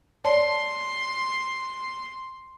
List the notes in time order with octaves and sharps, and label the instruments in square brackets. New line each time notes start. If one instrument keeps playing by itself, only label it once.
[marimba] C#5 D5 A5 [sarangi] C6